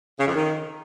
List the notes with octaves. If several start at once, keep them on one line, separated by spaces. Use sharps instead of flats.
C#3
F2
D#3